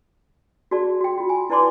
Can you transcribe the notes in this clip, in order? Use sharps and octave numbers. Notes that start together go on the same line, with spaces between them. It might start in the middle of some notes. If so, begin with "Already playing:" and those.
F#4 G#4 D5 A5
F#4 G5
F4 F#4
G#5
E4 B4 D5 A5 C6 D6